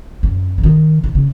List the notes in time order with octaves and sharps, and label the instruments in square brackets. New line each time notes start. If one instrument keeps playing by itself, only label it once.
[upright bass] F#2
C#3
D#3
B2
C#3